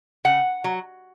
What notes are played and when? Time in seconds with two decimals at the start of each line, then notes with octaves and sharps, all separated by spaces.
0.25 C#3 F#5
0.64 F#3